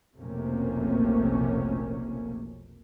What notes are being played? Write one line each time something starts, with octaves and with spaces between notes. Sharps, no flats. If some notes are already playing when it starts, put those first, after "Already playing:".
F1 B1 C3 A3 A#3 C#4